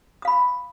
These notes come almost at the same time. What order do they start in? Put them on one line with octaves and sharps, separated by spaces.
D#6 F5 B5